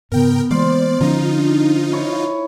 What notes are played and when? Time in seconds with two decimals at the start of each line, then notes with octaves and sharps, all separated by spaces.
0.12 G#2 C#3 B3 A#4 G5
0.51 E3 G#3 A#3 C5 D5 F5
1.01 D3 F3 C#4 D#4 F4 A#5
1.36 D4
1.92 E4 C#5